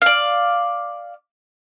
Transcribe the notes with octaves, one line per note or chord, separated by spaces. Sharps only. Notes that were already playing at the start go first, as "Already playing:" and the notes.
D5 F5